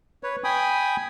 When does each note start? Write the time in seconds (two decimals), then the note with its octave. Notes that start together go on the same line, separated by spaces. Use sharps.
0.23 B4 C#5
0.44 G5 G#5 B5 D#6